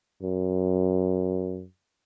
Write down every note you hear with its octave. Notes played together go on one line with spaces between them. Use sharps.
F#2